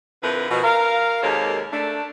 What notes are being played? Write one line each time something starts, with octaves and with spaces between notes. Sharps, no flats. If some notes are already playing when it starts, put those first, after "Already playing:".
F2 D3 E4 A#4 B4
B2 D#3 F3
A#4 F5
D#2 C3 G#3 A#3 A4 C#5
A3 D4